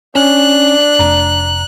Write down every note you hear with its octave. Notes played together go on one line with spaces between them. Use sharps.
C#4 D4 F#6
F1 A#5